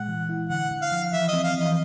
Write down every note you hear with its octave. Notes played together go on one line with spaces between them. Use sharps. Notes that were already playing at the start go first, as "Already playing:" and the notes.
Already playing: A#2 G#3 F#5
E3
E4
D3 F#5
D3
F5
F3
E3 E5
D#5
C4
F5
E3
D#5